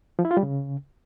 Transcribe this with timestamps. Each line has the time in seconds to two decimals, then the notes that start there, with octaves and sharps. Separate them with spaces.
0.19 F3
0.25 E4
0.31 F4
0.37 G3
0.43 C#3